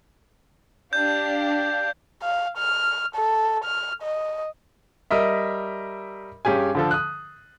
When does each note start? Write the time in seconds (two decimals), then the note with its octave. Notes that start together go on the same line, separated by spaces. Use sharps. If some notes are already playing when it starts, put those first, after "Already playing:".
0.93 D4 G4 F5 G6
2.22 F5
2.57 F6
3.15 A4
3.64 F6
4.03 D#5
5.11 G3 A#4 D#5 E5
6.45 G2 C#4 G4 G#4 G#5
6.75 D3 F3 A4
6.91 D#6 F#6